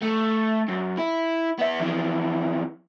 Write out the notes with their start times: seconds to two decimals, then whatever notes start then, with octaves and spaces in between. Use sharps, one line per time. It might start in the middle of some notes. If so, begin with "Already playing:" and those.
0.02 A3
0.68 F#2
0.97 E4
1.59 B3 E5
1.79 F2 E3